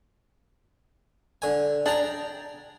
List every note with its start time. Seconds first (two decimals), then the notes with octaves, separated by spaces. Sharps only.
1.42 D3 G#5
1.86 D4 G#4 G5 A#5